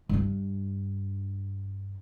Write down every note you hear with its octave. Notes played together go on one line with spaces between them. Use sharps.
G2 D4